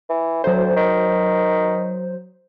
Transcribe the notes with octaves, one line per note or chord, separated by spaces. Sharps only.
E3
D2 F#3 C5
D#3